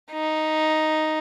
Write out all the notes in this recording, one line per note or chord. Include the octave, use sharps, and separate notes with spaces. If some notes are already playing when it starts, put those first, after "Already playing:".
D#4